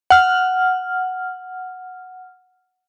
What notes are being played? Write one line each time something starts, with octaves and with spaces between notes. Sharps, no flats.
F#5 F6